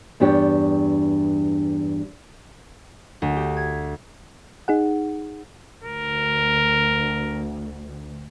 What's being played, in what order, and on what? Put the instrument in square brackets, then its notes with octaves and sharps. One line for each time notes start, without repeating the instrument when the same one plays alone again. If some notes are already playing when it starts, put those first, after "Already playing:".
[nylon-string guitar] E2 G2 D4 G4 C#5
[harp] D2
G4
G#6
[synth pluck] D#4 G#4 F#5
[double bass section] D2 [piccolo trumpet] A#4